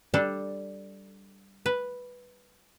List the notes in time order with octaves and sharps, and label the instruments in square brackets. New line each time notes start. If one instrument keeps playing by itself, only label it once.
[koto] G3 D4 A4
B4